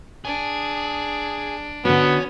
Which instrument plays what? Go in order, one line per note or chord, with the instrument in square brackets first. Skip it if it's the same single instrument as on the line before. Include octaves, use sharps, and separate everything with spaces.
[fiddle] D4 [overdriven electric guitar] G#4
[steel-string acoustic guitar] D3 F#4 [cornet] B3 [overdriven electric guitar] C#4